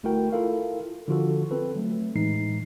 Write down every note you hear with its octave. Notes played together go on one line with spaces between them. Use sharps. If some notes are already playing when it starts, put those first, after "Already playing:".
G1 A3 E4 F#4 A#4 G5
E4 F4 A4 A#4 F5
D3 F3 F4 F#4 A4
C4 A4 B4
F#3 A3
A2 E3 G#3 D#4 C7